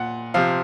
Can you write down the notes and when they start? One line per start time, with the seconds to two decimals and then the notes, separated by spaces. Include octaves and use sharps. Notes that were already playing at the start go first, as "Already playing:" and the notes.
Already playing: A#2 F#5
0.34 C3 F3 F5